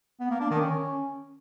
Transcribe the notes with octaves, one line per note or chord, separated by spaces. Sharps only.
B3
A#3
D4
D#3
C#4